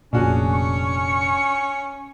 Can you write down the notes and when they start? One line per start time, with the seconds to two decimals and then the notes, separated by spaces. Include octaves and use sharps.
0.13 F1 A#2 C#4 D4 F#4 G#4
0.54 C#6